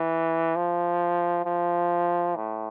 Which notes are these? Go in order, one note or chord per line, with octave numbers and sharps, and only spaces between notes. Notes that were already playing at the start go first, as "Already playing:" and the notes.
Already playing: E3
F3
F3
A2